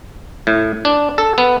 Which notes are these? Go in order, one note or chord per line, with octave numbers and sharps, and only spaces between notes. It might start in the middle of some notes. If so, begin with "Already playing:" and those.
A2
D4
A4
B3